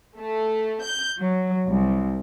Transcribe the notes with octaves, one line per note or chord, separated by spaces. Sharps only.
A3
G6
F#3
C2